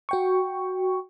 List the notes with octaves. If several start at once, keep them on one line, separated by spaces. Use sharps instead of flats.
F#4 G5 C#6